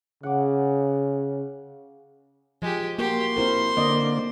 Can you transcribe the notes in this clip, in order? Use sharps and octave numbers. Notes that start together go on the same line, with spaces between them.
C#3 F#5 D6
F3 G#3 G4
A#3 F#4 G4 A#4 C6
C4 E4 A#4 C5
D3 A#3 D5 D#5